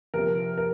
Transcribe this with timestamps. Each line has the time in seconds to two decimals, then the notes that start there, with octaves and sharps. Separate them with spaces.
0.14 C2 C3 F3 A#4
0.58 A#4